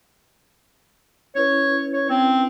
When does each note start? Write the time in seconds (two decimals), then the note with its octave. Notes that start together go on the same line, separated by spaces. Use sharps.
1.35 C#4 E4 B4 C#5
1.93 C#5
2.10 C4